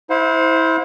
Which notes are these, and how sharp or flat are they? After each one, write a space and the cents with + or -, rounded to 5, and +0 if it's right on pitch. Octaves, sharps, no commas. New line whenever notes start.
E4 -20 C5 +0 F5 +45